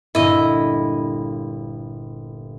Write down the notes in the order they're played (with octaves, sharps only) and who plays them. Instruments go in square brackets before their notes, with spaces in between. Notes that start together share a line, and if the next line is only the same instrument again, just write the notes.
[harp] G1 G2 A#2 [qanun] E4 D#5